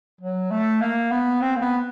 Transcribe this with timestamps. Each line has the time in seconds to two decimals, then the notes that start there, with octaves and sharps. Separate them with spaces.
0.21 F#3
0.51 A3
0.81 A#3
1.11 B3
1.42 C4
1.57 A#3
1.62 B3